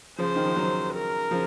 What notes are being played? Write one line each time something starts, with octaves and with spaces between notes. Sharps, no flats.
C#3 F3 C5
D#3
F3
D#3 F#3
A#4
C#3 F3